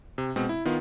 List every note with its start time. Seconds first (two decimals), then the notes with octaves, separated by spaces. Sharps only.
0.18 C3
0.36 B2 G#3 C4
0.49 E4
0.65 D#3 B3 F4